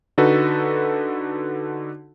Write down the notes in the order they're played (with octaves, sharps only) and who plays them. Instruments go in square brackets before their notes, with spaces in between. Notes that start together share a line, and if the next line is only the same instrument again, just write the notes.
[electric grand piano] D3 D#4 F#4 A4 B4